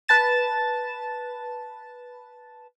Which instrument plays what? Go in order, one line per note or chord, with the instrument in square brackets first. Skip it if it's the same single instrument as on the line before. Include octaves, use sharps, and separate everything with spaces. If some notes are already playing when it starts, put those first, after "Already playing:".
[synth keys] B4 A5 A6 E7